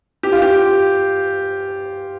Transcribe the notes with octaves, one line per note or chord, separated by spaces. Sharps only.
G4
F4
G4